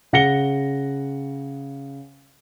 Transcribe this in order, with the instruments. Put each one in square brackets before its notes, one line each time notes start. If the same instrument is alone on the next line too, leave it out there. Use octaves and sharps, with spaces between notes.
[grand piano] C#3 F#5 A#6 C#7 G7